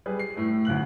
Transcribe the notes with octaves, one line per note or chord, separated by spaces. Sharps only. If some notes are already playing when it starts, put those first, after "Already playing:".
G3 G#4 B4
C7
A2 A3
D2 C#3 F#6 F#7